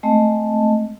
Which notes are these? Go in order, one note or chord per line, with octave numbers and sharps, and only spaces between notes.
G#3 A3 C4 D#5 A5